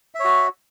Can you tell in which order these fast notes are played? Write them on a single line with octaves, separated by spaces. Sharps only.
E5 C#5 F#4